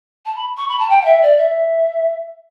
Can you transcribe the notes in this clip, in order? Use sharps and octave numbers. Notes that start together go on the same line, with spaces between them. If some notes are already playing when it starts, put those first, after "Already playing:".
A5
B5
C#6
B5
A5
G5
F#5
E5
D5
E5